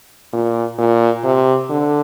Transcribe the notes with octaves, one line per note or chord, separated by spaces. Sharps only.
A#2
A#2
C3
D3